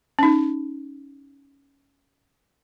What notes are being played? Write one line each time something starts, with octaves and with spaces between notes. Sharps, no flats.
C#4 D#4